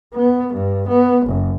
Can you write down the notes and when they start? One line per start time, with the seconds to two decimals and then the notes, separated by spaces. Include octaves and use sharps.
0.14 B3
0.53 G2
0.87 B3
1.26 F#1